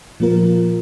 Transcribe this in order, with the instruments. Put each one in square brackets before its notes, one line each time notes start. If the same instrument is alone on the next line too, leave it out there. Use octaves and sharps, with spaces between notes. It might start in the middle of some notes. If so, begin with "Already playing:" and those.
[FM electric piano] A#2 F3 A#3 F4 A#4